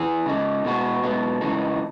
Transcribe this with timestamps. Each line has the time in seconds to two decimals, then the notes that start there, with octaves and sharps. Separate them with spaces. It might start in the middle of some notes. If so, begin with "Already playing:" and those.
Already playing: E3 G#4
0.26 C#3 G#3 D#4
0.64 B2 G#3 B3 F#4
1.03 B2 G#3 B3 D#4
1.41 C#3 E3 G#3 D#4